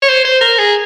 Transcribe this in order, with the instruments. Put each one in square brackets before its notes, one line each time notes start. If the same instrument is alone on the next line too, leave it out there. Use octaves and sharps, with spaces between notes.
[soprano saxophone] C#5
C5
C5
A#4
G#4